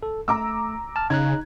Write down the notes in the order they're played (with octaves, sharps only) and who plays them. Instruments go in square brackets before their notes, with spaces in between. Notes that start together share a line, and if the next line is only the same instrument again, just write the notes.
[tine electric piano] A4
[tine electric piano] A3 [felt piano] A#5 D6 E6
[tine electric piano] A5 F6
[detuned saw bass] C#3 [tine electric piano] D#4 A#5 F#6 [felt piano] G#6